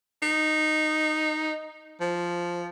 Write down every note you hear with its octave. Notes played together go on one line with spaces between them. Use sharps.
D#4
F3